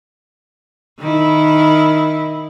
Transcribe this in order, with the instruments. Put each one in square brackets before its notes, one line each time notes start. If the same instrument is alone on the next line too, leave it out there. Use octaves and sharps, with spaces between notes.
[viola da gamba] D#3 E4